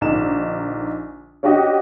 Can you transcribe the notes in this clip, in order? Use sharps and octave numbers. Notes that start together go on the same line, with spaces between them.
A#1 D3 D#4 E7
C#4 D4 F#4 G4 D#5 F#5